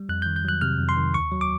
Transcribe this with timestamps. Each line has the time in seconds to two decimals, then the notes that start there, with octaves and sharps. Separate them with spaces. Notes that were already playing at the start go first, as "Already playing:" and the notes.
Already playing: G3
0.09 F2 F#6
0.22 D#3 G6
0.36 G6
0.45 F#3 F#6
0.61 C3 F6
0.79 F2
0.89 C6
0.97 D#3
1.14 D#2 C#6
1.31 F#3
1.41 D6